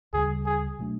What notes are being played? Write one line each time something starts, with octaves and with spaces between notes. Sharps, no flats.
D2 C#3 E3 G3 G#4
G#4
B2 F#3 A3 D4